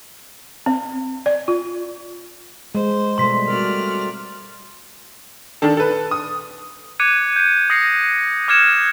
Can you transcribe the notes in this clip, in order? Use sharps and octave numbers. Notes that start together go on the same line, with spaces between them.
C4
D5
F4
G#3 C5
B2 G3 A3 C6 B6
A3 C4 F#4 A#4 D5 F6
D#3 D4 A4
A4 B4
D#6
D6 F#6 G#6 C#7 D#7
G6 C#7
D#6 A#6 C7 C#7
D6 F6 F#6 G#6 C#7 E7